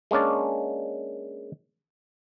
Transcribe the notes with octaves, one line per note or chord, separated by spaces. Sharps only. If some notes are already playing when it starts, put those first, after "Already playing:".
G#3 A#3 C#4 D4 D5